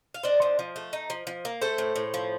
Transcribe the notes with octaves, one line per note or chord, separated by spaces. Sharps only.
F5
D4 C5 D#5
F3
F3
A3
D#4
F3
F3
A#3
A3 A4 C5
A2
A2
F3